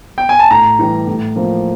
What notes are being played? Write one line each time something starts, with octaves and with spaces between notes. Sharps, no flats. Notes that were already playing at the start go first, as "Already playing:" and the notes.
G5
G#5
A5
A2 A#5
E3 G3
A2
F3 A#3